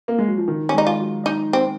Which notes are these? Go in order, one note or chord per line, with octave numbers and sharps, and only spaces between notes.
A#3
G#3
F#3
F3
D#3
C#4
G#3
D#4
F4
F#3
D#4
C4